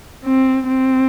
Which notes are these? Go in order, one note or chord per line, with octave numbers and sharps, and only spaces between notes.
C4
C4